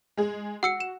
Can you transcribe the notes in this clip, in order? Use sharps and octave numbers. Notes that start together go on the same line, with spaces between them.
G#3 G#4
F#4 F#5 E6 C#7
E7